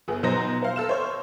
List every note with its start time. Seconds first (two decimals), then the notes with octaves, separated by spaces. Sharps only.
0.08 G1 B3 G#4
0.23 B2 F#3 D#4 C5 A#5 A#6
0.62 C5 F5
0.76 A4 F6 E7
0.89 C5 C#5